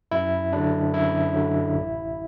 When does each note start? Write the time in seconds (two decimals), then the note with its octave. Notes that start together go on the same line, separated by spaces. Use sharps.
0.11 F#2 E4
0.52 D3 F#3 D4
0.93 F#2 E4
1.34 D3 F#3
1.75 A1